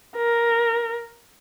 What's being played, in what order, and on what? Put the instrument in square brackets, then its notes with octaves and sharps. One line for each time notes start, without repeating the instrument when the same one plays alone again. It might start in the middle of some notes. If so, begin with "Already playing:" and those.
[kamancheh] A#4